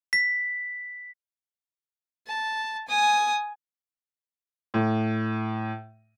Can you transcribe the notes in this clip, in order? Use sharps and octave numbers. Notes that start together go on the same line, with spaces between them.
B6
A5
G#5 D#6
A2